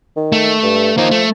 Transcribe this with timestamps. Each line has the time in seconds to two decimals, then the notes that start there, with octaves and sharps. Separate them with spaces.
0.16 D#3
0.32 A3
0.62 G2
0.97 F3 A#3 D#4
1.11 A3